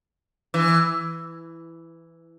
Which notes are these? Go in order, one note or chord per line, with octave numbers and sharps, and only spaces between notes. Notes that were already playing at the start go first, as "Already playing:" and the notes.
E3